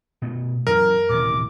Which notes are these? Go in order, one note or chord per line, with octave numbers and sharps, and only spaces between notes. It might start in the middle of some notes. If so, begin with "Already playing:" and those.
B2 A3
F#2 E3 A#4
D#1 A1 C3 D6